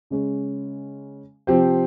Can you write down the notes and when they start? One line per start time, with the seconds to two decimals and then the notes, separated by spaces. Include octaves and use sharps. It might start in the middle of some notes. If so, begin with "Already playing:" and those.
0.10 C#3 G#3 C#4
1.47 C3 F3 C4 G4 C5